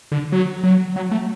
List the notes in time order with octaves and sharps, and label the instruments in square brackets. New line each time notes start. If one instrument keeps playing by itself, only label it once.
[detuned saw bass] D3
F#3
F#3
F#3
A3